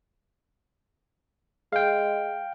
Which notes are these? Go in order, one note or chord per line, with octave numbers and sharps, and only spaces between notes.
G#3 F5 G5